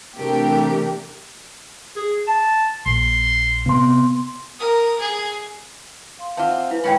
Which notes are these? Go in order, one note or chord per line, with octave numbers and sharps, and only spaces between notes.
C3 E3 A3 D4 G4 A#4
G#4
A5
A#1 C6
C3 B3 C6
A#4 D#6
G#4
F5 C6
C4 F4 E5 F#5 A5 D6
E4 B4 F5 G#5
A2 C#3 G#3 C#4 B4 E5 G5 B5